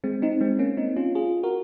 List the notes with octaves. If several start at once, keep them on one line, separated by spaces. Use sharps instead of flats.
G#3 C4
C4 D#4
G#3 C4
A#3 C#4
C4 D#4
C#4 F4
F4 G#4
F#4 A#4